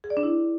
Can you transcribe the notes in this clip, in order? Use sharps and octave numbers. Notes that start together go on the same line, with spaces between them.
G#4
D5
D4
E4